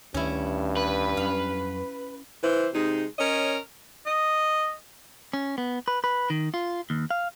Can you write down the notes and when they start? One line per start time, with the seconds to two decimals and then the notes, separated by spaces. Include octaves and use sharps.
0.14 D2 G2 D#3 A3 C#4 E4
0.77 B4
1.17 F2 F#3 C#4 F5
2.43 E3 C5
2.74 C3 G#3 D#4
3.18 C#4 A#4 C#5 D#5
4.06 D#5
5.33 C#4
5.58 B3
5.88 B4
6.04 B4
6.30 D#3
6.54 F4
6.90 D#2
7.11 F5